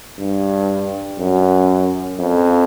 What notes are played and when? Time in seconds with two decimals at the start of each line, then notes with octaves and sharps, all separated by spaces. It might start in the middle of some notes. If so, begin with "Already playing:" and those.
0.19 G2
1.19 F#2
2.19 F2